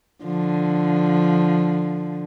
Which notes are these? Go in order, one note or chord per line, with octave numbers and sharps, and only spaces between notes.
D3 F3